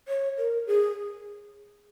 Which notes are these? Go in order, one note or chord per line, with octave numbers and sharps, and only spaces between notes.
C#5
A#4
G#4